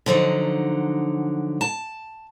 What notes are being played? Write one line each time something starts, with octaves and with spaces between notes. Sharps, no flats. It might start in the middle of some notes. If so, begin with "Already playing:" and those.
D3 F3 F#3 D#4
A5